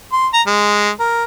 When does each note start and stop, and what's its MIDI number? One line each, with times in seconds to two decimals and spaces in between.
0.12 0.27 84
0.34 0.42 82
0.47 0.90 56
1.00 1.24 70